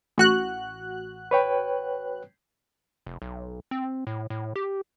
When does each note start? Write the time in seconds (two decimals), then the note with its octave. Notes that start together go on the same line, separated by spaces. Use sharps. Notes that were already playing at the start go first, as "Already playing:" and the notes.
0.18 A1 F#4 F#6
1.31 B4 C#5 G5
3.06 F1
3.22 B1
3.71 C4
4.07 A2
4.30 A2
4.56 G4